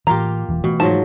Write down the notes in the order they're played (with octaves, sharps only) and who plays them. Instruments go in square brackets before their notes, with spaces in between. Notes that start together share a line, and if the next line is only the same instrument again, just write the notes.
[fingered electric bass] A2 E3 [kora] A#3 F4 G4 [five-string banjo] A#5
[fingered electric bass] E1 E3
[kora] B2 [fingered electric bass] E3 A3
[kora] G#2 F3 F#3 [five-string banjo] A5